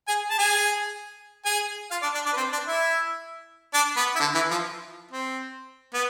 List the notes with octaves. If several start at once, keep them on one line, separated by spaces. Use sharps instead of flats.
G#4 G#5
A5
G#4 G#5
G#4 G#5
F4 F5
D4 D5
D4 D5
D4 D5
B4
C4 C5
D4 D5
E4 E5
D4 D5
B3 B4
E4
D3 D4
E3 E4
F3 F4
C4
B3